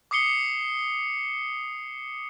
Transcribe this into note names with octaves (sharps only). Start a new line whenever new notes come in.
D6 D#6 C7 C#7 G7